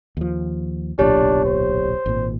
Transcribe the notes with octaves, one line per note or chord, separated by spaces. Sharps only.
D#2 F3
D1 B1 A#2 D4 G4 C#5
C5
G#1 A#2